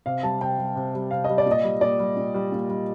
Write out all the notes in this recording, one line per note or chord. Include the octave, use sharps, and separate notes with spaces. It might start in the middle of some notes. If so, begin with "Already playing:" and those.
C3 F5
G3 A5
C3 G5
G3
C3
G3
C3 F5
D#5
G3
D5
A#2
D#5
G3
A#2 D5
G3
A#2
G3
A#2
G3